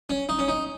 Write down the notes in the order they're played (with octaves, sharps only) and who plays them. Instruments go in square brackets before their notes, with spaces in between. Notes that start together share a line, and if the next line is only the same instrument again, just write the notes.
[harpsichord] C#4
D#4
C#4
D#4